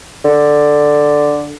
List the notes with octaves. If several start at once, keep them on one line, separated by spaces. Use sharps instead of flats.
D3